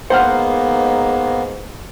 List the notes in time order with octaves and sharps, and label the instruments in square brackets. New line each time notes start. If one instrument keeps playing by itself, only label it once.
[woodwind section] G#2 [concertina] A#3 B3 [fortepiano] C5 F#5 F6